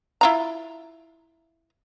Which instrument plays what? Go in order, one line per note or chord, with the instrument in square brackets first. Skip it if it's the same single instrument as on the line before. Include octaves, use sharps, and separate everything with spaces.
[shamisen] E4 F4 A#5